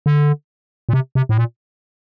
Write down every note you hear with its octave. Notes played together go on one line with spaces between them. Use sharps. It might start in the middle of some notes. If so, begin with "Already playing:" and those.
D3
A#2
C3
C3
A2
A#2